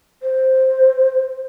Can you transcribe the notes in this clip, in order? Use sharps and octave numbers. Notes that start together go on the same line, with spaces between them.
C5